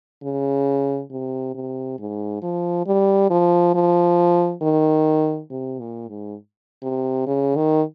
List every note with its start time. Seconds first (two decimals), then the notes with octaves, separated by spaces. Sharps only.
0.23 C#3
1.11 C3
1.55 C3
1.99 G#2
2.43 F3
2.86 G3
3.30 F3
3.75 F3
4.62 D#3
5.51 C3
5.80 A#2
6.09 G#2
6.83 C3
7.27 C#3
7.56 D#3